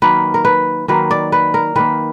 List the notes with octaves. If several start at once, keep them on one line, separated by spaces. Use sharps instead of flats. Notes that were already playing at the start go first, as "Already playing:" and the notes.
D#3 F#3 A#3 B4
A#4
B4
D#3 F#3 A#3 B4
D5
B4
A#4
D#3 A#3 B4